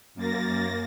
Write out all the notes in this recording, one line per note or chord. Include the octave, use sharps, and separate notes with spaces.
F#2 A#3 A6 A#6